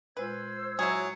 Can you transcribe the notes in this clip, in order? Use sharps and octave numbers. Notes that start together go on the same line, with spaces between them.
A#2 G#3 F4 B4 C5 E6 G#6
F#3 E4 G#4